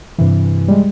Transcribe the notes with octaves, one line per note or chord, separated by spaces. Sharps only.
G2 C3 E3
G3 G#3